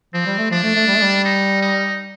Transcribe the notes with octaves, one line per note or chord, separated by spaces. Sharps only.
F3 C4
G3
A3
F3 D4
A3
A3
G3
A3
G3
D#4
D#4